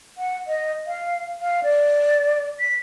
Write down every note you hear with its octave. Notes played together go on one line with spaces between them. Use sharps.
F#5
D#5
F5
F5
D5
B6